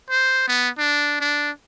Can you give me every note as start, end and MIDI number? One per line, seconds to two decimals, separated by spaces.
0.10 0.45 72
0.48 0.69 59
0.78 1.17 62
1.21 1.50 62